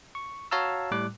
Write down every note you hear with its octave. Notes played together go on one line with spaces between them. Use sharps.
C#6
F#4 C#5 F5 A5 A#5 E6
A2 G3 D6 F#6